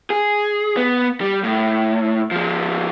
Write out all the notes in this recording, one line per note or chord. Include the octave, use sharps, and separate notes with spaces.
G#4
B3
G3
A2
F3 G#3